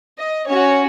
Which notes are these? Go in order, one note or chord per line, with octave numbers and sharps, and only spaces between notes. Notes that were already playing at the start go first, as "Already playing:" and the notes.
D#5
C#4 F#4 C#5